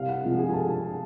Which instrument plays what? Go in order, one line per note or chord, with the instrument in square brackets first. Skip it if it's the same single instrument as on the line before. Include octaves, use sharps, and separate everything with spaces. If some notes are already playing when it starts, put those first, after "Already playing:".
Already playing: [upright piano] C2 F5
F#5
C3 F3 G#3
G#4 G#5
G#5
A4 A5